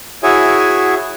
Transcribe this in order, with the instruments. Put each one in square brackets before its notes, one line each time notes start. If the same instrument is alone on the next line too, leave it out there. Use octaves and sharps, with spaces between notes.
[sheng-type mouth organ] E4 F#4 G#4 C#5 E5 G#5